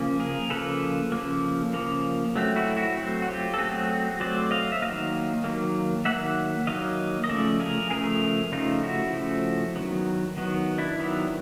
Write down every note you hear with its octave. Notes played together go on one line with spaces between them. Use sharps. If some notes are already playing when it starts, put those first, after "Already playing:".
Already playing: C#3 F3 A#3
G#4 A#4
C#3 F3 A#3 A4 B4
C#3 F3 A#3
C#3 F3 A#3
F#3 A3 C4
E4 F#4
E4 F#4
F#3 A3 C4
F#4
F4 G4
A4
F#3 A3 C4 F#4 G#4
F#3 A3 C4 C5 D5
D#5 F5
E5
D#3 F#3 A#3 D#5 F5
D#3 F#3 A#3
D#3 F#3 A#3 E5 F#5
D#3 F#3 A#3 D#5 F5
D#5
C#3 F3 A3 D5 E5
G#4 A#4
C#3 F3 A3 G#4 A#4
C#3 F3 A3 D#4 F4
E4 F#4
C#3 F3 A3
D#3 F#3 B3
D#3 F#3 B3
D4 E4
D#3 F#3 B3 D4 E4